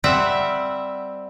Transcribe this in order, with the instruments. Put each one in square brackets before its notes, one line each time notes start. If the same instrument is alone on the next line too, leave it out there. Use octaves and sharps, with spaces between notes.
[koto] G3 C4 E5 F#5